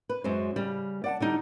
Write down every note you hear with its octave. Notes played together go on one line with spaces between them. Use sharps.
B4
F#2 F#3 G#3 C5
C#3 G3
D5 F#5 A5
D3 G3 D#4